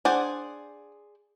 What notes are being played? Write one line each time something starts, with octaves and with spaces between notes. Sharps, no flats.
D4 G#4 C5 D5 F#5